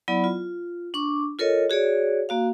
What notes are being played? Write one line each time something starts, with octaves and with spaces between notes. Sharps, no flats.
F#3 B3 E4 D5 B5
F4
D4 C#6 D6
F4 A4 A#4 C#5 D#5
F#4 G#4 C#5 D5
A#3 F#4 F5